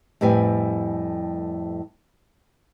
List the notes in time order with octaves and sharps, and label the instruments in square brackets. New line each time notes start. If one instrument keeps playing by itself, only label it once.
[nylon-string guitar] F2 A2 G3 B4 G#5